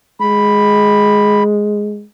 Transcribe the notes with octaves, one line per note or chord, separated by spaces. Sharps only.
G#3 B5